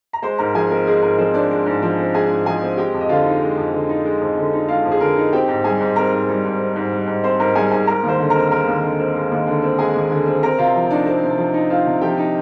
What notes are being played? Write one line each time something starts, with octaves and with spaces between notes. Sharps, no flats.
A#5
G#3 C5 C6
G#2 A#4 A#5
F3 G#4 G#5
C4 A#4
G#3 G#4
G#2 A#4
F3 C4 C5
C4 D4 D5
G#3
G#2
F3
C4
G#3 G#4 G#5
G#2
F3 G#4 G#5
C4
G#3 G4 G5
F2
D#5
D3 F4 F5
D#4
G#3
F2
D3
D#4
G#3
F2
D3
D#4
G#3 F4 F5
F2
G#4
D3 A#4
D#4
C4 G4 G5
G#2
G3 G#4 G#5
G#2
C4 A#4 A#5
G#2
G3
G#2
C4
G#2
G3
G#2
C4 C5 C6
G#2 A#4 A#5
G3 G#4 G#5
G#2 G#4 G#5
G#3 A#4 A#5
D#2
C5 C6
D3
A#4 A#5
C4
G#3 A#4 A#5
D#2
D3
C4
G#3
D#2
D3
C4
G#3 G#4 G#5
D#2
D3
C4
C4 A#4 A#5
C3 F4 F5
F3
D4 D#4 D5
C4
C3
F3
D#4
C4 F4 F5
C3
F3 G4 G5
D#4